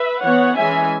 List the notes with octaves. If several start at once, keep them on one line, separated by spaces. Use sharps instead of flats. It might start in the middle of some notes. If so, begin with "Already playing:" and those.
Already playing: B4 E5
E3 B3 C#5 F#5
E3 G#3 C#4 E5 G#5